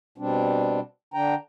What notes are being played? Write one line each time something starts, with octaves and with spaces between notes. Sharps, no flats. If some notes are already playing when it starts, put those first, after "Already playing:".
B2 G3 C4 D4
D3 D4 G5 A#5